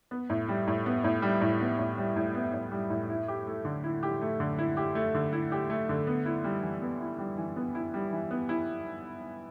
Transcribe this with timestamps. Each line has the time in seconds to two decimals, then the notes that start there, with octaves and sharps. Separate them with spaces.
0.11 B3
0.30 A2
0.48 G3
0.67 A2
0.86 B3
1.04 A2
1.22 G3
1.41 A2
1.61 B3
1.79 A2
1.98 G3
2.16 A2
2.35 B3
2.54 A2
2.72 G3
2.90 A2
3.10 E4
3.28 G4
3.47 A3
3.65 D3
3.84 E4
4.03 G4
4.21 A3
4.40 D3
4.58 E4
4.77 G4
4.95 A3
5.14 D3
5.33 E4
5.52 G4
5.70 A3
5.89 D3
6.07 B3
6.26 E4
6.44 G3
6.63 E3
6.81 B3
7.00 E4
7.18 G3
7.38 E3
7.56 B3
7.75 E4
7.94 G3
8.13 E3
8.31 B3
8.49 E4